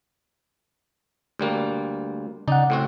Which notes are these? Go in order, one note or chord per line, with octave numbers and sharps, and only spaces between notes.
D2 G3 A#3
C#3 D#4 D5 F#5
A2 C4 F#4